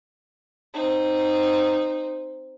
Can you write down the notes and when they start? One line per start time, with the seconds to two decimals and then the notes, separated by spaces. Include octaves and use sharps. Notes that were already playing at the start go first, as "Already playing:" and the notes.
0.74 C4 D#4